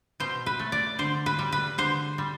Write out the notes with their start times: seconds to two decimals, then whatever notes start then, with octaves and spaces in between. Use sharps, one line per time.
0.20 B2 C5
0.46 B4
0.59 A3
0.72 D5
0.98 D3 C5
1.26 B4
1.39 G3
1.52 B4
1.78 D3 C5
2.18 G3